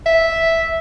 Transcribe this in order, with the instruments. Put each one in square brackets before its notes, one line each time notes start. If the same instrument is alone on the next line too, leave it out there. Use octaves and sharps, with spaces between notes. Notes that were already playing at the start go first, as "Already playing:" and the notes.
[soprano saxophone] E5